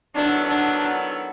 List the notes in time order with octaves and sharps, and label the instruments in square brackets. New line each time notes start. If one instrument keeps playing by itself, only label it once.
[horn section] D#3 F#3 B3 E4 A4 [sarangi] D4
[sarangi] D4